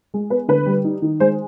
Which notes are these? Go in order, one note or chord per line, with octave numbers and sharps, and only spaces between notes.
G#3
B3 B4
D3 B4
G3
D#4
D#3
G#3 C5